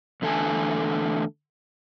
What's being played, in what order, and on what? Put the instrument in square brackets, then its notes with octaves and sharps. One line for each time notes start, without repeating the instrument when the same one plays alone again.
[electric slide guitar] E2 D3 A3 A4 G#5